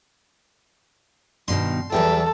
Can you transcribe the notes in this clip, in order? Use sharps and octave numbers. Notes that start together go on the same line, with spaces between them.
G2 B2 D#3 C6
E2 F#3 G3 A4 G5